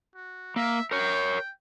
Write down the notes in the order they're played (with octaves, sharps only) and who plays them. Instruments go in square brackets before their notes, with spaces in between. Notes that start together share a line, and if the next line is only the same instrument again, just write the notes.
[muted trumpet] F#4
[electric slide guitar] A#3 [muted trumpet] E5
[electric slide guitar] A#4 C#5 [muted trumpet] G5